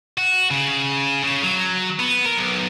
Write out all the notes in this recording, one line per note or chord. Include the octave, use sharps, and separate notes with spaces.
F#4
C#3
C#3
F#3
B3
A#4
B1